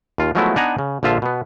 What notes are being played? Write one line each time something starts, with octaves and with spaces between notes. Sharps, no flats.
D#2 F4
F3 F#3 G#3 A3 B3 E4
B3 D4 D#4 F#5 G#5 A#5
C#3
A#1 D3 F3 F4 E5
B2 B3